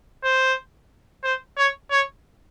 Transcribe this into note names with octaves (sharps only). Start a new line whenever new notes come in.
C5
C5
C#5
C#5